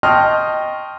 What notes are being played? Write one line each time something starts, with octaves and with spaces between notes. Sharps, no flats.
D#5 G5 A5 C6 C#6 F6